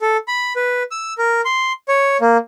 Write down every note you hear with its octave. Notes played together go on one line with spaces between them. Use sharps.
A4
B5
B4
E6
A#4
C6
C#5
A#3